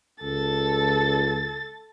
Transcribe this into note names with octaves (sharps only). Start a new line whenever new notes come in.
C#2 A4 A6